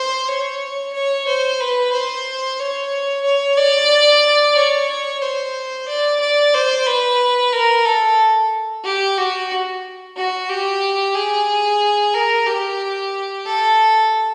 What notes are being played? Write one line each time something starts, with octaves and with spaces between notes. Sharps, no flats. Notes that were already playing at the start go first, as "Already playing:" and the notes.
Already playing: C5
C#5
C#5
C5
B4
C5
C#5
C#5
D5
C#5
C5
D5
D5
C5
B4
A#4
A4
G4
F#4
F#4
G4
G#4
A#4
G4
A4